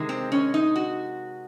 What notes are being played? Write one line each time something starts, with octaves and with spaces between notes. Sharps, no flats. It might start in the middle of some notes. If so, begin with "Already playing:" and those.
Already playing: C3 D#3 G#3
C4
C#4
D#4
F#4